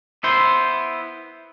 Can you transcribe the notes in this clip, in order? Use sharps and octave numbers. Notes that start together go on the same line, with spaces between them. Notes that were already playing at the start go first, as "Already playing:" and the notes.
B3 E4 C5